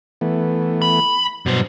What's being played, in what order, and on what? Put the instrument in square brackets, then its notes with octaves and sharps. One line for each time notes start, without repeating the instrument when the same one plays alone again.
[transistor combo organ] E3 A3 B3
[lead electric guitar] B5
[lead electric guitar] G2 C5 [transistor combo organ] B2 F#3